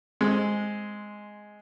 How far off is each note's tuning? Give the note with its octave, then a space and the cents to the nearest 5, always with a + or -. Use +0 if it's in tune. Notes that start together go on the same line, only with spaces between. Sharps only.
G#3 +0 C4 +0